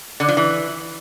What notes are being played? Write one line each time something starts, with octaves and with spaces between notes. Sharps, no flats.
D3
F3
E3